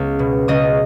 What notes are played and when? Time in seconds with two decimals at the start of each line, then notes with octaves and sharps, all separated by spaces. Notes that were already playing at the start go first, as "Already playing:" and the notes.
Already playing: C#2 B3
0.19 B2
0.48 C#2 D#5 D#6